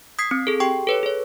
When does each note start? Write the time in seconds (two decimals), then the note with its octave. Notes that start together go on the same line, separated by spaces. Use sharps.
0.19 D#6 G#6 B6 C7
0.31 C4
0.47 G#4 A4
0.60 G4 G5 C#6
0.87 A4 B4 C#5
1.03 G#4 C#5